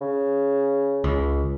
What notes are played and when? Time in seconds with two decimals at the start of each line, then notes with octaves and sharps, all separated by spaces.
0.01 C#3
1.04 C#2